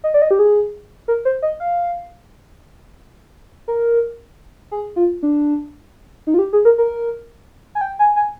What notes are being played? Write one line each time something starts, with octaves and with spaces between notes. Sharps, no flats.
D#5
D5
D#5
G4
G#4
A#4
C5
D#5
F5
A#4
G#4
F4
D4
D#4
F4
G4
G#4
A#4
A#4
G#5
G5
G#5
G#5